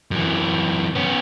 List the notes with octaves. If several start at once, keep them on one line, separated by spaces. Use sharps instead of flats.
F#2 E3
B3 C#4